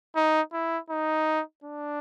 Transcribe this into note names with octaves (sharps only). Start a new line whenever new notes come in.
D#4
E4
D#4
D4